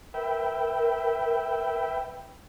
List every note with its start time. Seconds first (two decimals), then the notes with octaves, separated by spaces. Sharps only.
0.14 A#4 B4 E5 G5